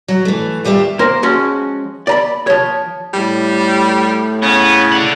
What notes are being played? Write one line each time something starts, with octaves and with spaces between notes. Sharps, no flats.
F#3
E3 A3
D#2 G3 F4 G4 E5
A#3 A#4 C5
F3 G#3 C#4 F#4
D5 A#5 B5
F3 C#5
A2 G3
C#3 B3
D5 F#5